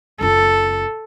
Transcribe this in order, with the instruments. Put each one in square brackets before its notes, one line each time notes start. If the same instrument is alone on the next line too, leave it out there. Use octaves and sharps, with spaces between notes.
[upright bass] F#1 F4 [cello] A4